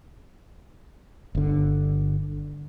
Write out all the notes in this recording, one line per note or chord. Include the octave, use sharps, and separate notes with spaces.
G1 D3